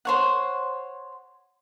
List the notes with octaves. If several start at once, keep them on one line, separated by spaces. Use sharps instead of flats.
C5 C#5 F#5